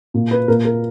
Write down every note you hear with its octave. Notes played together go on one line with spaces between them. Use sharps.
A#2
B4
A#2 A#4
A#4